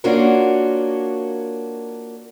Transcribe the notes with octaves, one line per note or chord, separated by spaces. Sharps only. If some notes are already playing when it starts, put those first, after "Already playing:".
A#3 C#4 D4 F4 F#4 A#4